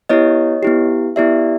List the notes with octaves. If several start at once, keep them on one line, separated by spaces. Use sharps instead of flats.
B3 E4 G4 C#5 D#5
B3 E4 G4
B3 E4 G4 D5 E5